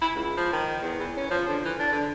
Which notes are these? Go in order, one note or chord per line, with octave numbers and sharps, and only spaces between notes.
E4
C#2
F3
D#3
E2
E3
C#4
F3
D3
E3
D4
D3